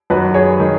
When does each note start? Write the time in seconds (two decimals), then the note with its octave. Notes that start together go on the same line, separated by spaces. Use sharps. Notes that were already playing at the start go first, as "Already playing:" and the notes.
0.10 F#2 D#3 F#4 B4
0.34 G#4 C#5
0.60 D#3